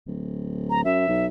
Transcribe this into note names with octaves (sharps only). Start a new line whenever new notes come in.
D1
A#5
F#2 E5
B1